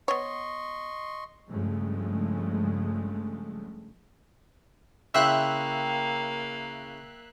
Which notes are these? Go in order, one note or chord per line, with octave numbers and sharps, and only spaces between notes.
B3 C#5 D#5 C6 C#6
G2 C#3 F3 G#3 A3
C#3 A#3 E4 E5 G5 C6 E6 F#6